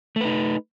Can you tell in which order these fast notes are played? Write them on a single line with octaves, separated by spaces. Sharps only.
A3 B4 D#4